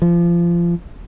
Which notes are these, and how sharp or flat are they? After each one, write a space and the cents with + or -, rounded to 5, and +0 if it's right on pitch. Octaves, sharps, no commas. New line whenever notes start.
F3 -25